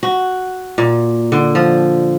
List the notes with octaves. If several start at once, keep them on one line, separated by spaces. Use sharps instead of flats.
F#4
A#2
D3
F3